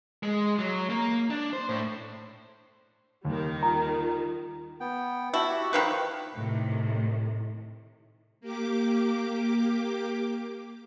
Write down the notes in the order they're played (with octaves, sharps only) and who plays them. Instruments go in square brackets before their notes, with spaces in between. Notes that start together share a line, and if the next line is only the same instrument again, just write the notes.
[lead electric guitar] G#3
F#3
A#3
D4
C5
A2
[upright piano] D#2 [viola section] D#3 G3
[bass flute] F4 [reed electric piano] A#5
[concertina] B3 G5
[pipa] E4 [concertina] F#4 A5
[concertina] F#4 G4 F#5
[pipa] D#3 F3 B4 [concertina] C5
[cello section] A2 C3 D#3
[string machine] A#3 G4 D6